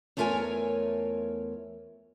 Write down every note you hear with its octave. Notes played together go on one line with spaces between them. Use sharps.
E2 A3 F4 A#4 C#5 G#5